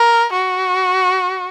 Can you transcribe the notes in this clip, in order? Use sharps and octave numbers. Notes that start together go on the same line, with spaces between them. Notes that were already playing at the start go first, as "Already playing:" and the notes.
Already playing: A#4
F#4